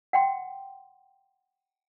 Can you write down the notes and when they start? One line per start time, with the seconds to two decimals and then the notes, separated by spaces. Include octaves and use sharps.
0.13 F#5 G5 C6